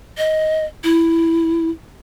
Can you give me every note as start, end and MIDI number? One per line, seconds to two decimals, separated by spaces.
0.18 0.65 75
0.84 1.70 64